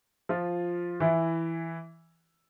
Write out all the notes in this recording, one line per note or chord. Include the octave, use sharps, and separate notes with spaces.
F3 F4
E3 E4